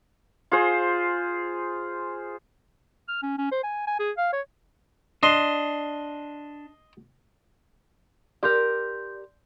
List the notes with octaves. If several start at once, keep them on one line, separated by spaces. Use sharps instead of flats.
F4 G#4 C5
F6
C#4
C#4
C5
G#5
G#5
G#4
F5
C#5
D4 D#5 C6
G4 A#4 D5 C6 G6